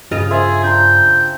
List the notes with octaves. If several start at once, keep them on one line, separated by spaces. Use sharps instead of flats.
G2 C#3 F4 D#5
G#4 C5 E5 G#5
D4 G5 A#5 C6